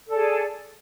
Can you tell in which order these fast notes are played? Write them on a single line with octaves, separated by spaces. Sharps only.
A4 D5 G#4